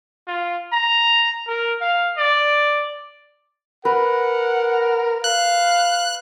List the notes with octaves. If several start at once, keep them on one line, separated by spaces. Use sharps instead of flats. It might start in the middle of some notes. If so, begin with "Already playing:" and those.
F4
A#5
A#4
F5
D5
A#4 B4 F#5
F5 F#6